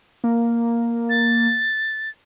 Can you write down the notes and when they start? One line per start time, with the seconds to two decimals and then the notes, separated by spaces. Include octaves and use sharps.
0.24 A#3
1.10 A6